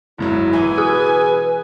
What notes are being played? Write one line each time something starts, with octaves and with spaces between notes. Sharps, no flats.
F#1 G#2 F#3 E4
B2 E3 G#5
G#4 B4 D#6 F#6